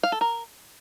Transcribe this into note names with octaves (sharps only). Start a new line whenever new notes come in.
F5
A4
A#4